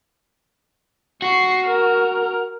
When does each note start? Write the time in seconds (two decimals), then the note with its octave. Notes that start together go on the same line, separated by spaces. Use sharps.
1.22 F#4 C#6 C7
1.66 A#4